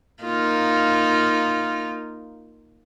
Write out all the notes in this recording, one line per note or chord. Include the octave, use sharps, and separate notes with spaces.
A#3 D#4 F4